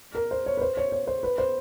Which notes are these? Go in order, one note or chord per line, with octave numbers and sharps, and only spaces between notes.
A#4
C5
C#5
B4
C5
C#5
C#5
C5
B4
C5